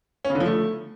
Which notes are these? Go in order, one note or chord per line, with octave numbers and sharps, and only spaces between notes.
C#4
C#3
D3
F3
A3